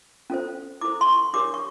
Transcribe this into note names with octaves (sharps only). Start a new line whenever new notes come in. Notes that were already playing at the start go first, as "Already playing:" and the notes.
C#4 F4 A4 C5
E4 A4 C5 D6
C6
C#6
D4 G4 A#4 C#5 D6
C#6